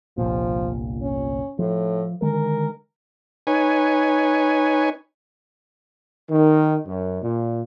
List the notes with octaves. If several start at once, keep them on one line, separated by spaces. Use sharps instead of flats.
G1 C2 A#2 F3
C#4
A2 F3
D3 D#3 G#3 A#4
D#4 B4 C#5 G#5
D#3
F#2
A#2